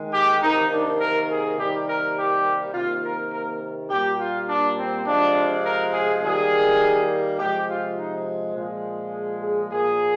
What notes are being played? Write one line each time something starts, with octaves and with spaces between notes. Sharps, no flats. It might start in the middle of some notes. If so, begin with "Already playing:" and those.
Already playing: D#3 G#3
G4
C3 D#3 A#3 D#4
D4
A#4
G#4
C3 D#3 G3 A#3 G4
A#4
G4
C3 D#3 A#3 F4
A#4
A#4
A#2 G3 A#3 G4
F4
D4
C4
C3 F3 G#3 D4
A#4
G#4
D#3 G3 A#3 G#4
C3 F3 G#3 G4
F4
D#4
A#2 F3 G#3
G#4
G#4
A#2 F3 A#3 G#4